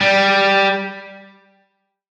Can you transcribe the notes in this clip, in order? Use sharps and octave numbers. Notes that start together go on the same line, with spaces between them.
G3